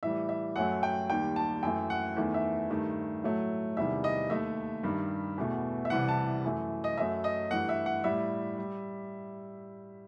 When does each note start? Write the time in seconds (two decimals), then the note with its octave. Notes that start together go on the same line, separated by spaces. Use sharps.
0.03 A2 E3 G3 E5
0.29 E5
0.56 F#2 F#3 A3 F#5
0.83 G5
1.09 D#2 D#3 G3 G5
1.36 A5
1.63 F#2 E3 A3 G5
1.90 F#5
2.16 E2 D#3 A3
2.34 E5
2.70 G2 D#3 A3
3.23 A2 F#3 A3
3.77 E2 C3 D#3 G3 E5
4.04 D#5
4.30 D#2 D#3 A3 E5
4.83 G2 D#3 G3
5.38 E2 B2 A3
5.85 E5
5.90 C2 C3 E3 G3 F#5
6.08 A5
6.45 F#2 E3 A3
6.84 D#5
6.97 F#2 F#3 A3 E5
7.24 D#5
7.51 G2 E3 A3 F#5
7.69 E5
7.86 F#5
8.04 A2 G3 E5
8.58 G3